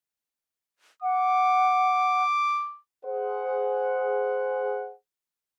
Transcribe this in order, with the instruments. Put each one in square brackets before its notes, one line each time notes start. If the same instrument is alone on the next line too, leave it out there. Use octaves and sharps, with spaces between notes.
[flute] F#5 [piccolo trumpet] D6
[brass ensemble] G#4 C5 F#5